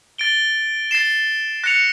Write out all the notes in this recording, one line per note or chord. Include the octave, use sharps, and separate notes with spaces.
A6 D7 G7
A6 C7 E7
F#6 A#6 C#7 F7